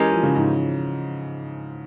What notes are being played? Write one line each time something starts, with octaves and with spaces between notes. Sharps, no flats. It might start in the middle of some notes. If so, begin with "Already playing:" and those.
Already playing: E3 G#3 C#4 G4 A#4
F3
C#3
G#2